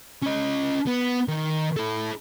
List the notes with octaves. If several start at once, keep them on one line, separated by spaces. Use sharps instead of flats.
C#4 D#5
B3
D#3
E4 A4